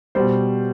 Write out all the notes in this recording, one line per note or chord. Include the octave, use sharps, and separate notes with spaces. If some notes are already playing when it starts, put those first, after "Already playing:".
B2 G3 C5